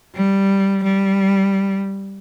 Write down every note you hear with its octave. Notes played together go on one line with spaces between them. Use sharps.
G3
G3